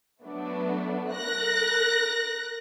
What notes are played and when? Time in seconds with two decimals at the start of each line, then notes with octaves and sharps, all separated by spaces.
0.24 F#3 A3 B3 D4
1.11 A#4 F#6 A#6